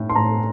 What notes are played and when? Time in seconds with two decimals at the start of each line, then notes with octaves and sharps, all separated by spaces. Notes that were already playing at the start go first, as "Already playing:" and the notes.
Already playing: A2
0.09 C6
0.16 A2 A#5